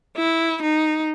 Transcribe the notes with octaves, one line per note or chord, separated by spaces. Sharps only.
E4
D#4